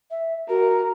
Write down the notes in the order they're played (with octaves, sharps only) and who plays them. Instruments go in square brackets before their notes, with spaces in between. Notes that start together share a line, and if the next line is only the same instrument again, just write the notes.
[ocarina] E5
[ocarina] F#4 [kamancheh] A#4